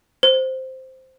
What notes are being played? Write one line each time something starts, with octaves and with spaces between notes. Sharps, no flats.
C5